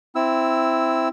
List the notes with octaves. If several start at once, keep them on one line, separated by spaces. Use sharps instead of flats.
C4 E4 E6